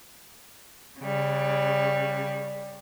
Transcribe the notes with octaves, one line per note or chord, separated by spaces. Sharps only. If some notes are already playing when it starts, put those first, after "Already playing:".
C#3 G3